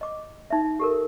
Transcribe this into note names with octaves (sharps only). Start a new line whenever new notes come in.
D#5 D6
D#4 E5
G4 A4 A#4